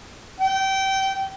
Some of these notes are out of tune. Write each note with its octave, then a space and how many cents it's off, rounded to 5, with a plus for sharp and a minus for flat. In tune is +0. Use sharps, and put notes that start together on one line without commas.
G5 -25